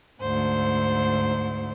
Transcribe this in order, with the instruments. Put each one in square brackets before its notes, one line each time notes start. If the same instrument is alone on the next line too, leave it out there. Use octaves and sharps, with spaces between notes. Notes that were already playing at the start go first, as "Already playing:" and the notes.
[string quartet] D2 G#2 C5